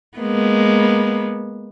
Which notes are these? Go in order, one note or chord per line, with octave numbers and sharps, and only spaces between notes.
G#3 A#3 B3